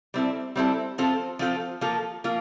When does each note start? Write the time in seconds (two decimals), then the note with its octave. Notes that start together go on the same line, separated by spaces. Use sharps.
0.14 G3 C4 E4 A4
0.56 G3 C4 E4 A4
0.98 F3 C4 F4 A4
1.39 F3 C4 F4 A4
1.81 F3 A#3 F4 A4
2.24 F3 A#3 F4